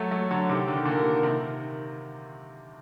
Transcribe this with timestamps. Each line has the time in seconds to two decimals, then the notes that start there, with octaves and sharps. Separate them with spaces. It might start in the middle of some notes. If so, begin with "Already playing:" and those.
Already playing: F#3 A3 A4
0.11 F#3 A3
0.31 D3 F#3
0.49 C3 D#3 G4
0.68 D3
0.76 D#3
0.85 A#2 D3 A#4
1.23 C3 D#3